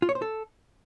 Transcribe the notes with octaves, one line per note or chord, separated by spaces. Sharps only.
F4
C#5
C5
A4